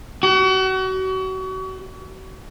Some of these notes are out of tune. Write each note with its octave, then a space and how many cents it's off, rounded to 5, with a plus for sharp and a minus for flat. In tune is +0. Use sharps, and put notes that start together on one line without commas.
F#4 +35